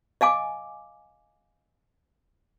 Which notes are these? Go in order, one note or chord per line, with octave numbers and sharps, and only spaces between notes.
D#5 F5 G#5 D6